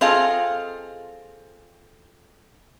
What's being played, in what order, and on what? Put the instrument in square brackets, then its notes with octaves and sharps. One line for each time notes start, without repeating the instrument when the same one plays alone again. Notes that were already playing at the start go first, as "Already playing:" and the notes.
[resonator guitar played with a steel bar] C4 F4 G#4 A4 D#5 F5